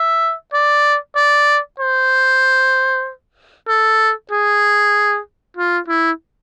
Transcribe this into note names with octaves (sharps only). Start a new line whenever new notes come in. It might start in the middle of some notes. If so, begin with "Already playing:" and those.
Already playing: E5
D5
D5
C5
A4
G#4
F4
E4